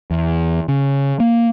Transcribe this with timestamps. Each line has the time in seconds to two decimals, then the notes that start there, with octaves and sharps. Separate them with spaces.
0.11 E2
0.68 C#3
1.20 A#3